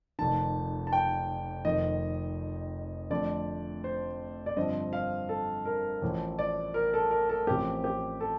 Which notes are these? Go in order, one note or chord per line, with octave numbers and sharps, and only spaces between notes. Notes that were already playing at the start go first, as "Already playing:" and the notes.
F1 F2 D#3 A5
A5
G5
F1 F2 D#3 D#5
F2 D3 A3 D5
C5
D5
G2 D3 F3 C4 D#5
F5
A4
A#4
A1 A2 F3 A3
D5
A#4
A4
A#4
A4
A1 A2 F3 C4 G4
G4
A4